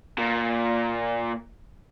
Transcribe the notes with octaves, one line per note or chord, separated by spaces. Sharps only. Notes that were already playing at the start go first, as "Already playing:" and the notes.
A#2